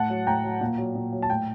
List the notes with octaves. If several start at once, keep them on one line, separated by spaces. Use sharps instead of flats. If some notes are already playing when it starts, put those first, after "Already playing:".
Already playing: A2 F#5 A5
F#3
A2 G5 A#5
F#3
A#2
F#3
A#2
F#3
A5
A2 G5